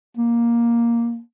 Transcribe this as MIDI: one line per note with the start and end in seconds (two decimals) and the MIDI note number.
0.17 1.19 58